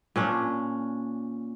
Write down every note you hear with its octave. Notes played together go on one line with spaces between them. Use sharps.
A#2 C#4 D4